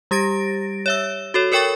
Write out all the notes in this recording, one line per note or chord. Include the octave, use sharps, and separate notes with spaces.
G3 G4 A6 A#6 D7
C#5 E5 E6
F#4 A4 C#5
A4 A#4 C#5 G5 C#6 A6